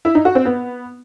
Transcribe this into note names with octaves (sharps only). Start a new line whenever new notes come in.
E4
D#4
F#4
C4
B3